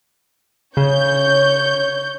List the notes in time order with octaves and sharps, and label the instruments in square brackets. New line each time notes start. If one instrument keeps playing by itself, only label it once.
[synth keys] C#3 [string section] C#5 G6